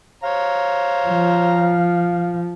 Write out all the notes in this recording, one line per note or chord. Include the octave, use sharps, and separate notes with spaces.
C5 C#5 F5 A#5
F3